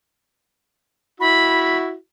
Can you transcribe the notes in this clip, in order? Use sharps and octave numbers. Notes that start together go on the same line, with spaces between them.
E4 F#4 B5